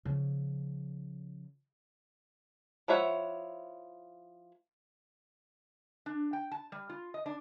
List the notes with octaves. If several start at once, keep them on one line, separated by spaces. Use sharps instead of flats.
C#3 F3
F3 E4 C#5 E5 F#5
D4
G5
A5
G3
F4
D#5
D4